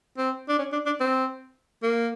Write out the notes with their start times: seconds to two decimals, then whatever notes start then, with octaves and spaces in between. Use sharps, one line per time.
0.18 C4
0.49 D4
0.59 C#4
0.72 D4
0.86 D4
1.00 C4
1.83 A#3